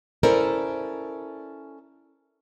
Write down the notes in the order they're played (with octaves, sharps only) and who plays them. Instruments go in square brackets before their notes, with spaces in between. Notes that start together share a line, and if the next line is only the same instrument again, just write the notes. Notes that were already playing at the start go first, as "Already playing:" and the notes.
[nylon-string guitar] C#4 E4 A4 A#4 C5 D5